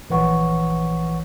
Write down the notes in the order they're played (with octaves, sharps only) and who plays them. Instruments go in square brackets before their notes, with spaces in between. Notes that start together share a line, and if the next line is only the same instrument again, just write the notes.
[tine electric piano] A#1 E3 B4 C#5 F#5 C#6